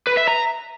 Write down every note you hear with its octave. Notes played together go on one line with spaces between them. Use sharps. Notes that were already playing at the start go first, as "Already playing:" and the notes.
B4
E5
A#5